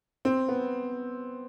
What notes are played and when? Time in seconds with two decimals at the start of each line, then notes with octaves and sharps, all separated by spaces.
0.25 C4
0.48 B3